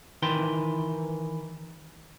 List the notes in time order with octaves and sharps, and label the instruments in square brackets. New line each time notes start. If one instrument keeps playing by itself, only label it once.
[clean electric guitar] D#3 E3 B4 G5 C6